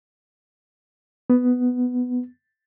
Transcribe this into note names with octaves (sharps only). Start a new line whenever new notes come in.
B3